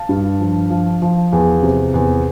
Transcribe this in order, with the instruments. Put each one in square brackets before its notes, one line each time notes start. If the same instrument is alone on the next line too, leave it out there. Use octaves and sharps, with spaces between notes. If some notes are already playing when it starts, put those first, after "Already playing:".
Already playing: [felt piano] F5 A5
G2
F3
F3
F3
E2
C3
E2